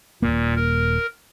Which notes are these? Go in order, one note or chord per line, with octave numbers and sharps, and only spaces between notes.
D#1 F#2 A#2 A#3
A#4